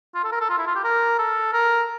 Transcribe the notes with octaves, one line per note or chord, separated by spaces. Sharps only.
F4
A4
A#4
A4
F4
E4
F4
G4
A#4
A4
A#4